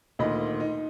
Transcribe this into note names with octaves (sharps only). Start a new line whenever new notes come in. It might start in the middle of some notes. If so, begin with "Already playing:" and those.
D2 A#2 D#3 A#3 D#5 B5
D#4